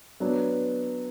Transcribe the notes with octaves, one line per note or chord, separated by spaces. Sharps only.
F#3 B3 D4